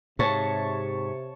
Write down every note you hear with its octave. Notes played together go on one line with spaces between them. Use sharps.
G#2 C3 C#5 A5